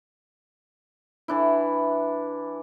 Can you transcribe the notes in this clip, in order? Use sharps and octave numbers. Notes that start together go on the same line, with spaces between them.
E3 D4 E4